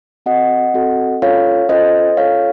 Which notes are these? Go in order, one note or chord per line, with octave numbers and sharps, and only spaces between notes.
C4 F#4 A4 D#5 F#5
C4 F#4 A4
C#4 F4 A4 C#5 F5
C#4 F4 A4 C5 D#5
C#4 F4 A4 C#5 F5